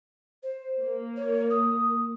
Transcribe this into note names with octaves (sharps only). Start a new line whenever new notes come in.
C5
A#3
C#5
D#6